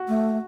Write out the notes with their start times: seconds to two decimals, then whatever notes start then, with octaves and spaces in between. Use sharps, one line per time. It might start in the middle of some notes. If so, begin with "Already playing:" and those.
Already playing: F#4
0.08 A3